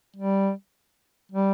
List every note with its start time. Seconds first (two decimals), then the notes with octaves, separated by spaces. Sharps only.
0.16 G3
1.32 G3